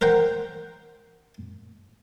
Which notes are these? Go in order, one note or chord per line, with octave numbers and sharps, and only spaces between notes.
A#4 C5 F#5 G5